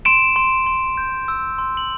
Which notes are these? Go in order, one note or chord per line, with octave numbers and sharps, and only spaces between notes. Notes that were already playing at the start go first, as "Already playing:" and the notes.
C6 D7 E7
C6
C6
G6
E6
C6
F#7